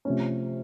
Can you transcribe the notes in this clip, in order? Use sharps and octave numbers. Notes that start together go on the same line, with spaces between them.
C3 F3 A3 C#4